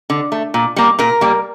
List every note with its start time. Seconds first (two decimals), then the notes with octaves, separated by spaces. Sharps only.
0.10 D3
0.32 A3
0.54 A#2
0.76 G3 A#3
0.99 A#2 A#4
1.21 G3 A#3